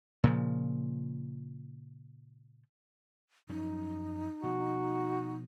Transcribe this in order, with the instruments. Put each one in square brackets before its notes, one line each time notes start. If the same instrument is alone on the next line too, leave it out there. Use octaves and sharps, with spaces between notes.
[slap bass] A#2 C#3 F3
[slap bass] F#2 F3 C#4 [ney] D#4
[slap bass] B2 F3 [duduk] F#4